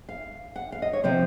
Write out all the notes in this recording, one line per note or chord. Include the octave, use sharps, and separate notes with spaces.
F5
F#5
F5
D#5
C#5
C3 F3 C4 C5